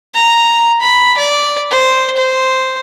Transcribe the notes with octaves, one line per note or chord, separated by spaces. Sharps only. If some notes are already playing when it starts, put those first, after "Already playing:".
A#5
B5
D5
C5
C5